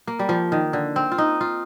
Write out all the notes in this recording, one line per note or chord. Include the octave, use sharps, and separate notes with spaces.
A#3
G3
F3
D#3
D3
C4
F4
D#4
F4